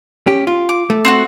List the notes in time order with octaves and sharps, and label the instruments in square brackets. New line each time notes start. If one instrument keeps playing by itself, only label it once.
[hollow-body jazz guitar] C#4 G4
F4
[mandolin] D6
[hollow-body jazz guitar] A3
[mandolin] C4 D#4 F#4